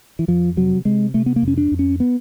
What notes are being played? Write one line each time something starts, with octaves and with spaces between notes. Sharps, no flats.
E3
F2 F3
C3 F#3
C3 G#3
C3 A3
B3
A#3
F2 C#4
D4
F2
C#4
B3